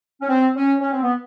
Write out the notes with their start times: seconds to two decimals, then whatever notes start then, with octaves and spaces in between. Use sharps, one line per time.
0.21 C#4
0.29 C4
0.56 C#4
0.81 C#4
0.92 C4
1.02 B3